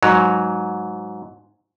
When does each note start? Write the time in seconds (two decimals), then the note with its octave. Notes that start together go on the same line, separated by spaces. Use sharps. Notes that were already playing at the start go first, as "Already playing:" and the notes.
0.03 G#2 F#3